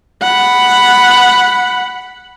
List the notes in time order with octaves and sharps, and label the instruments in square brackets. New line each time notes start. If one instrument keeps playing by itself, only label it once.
[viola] F#5 B5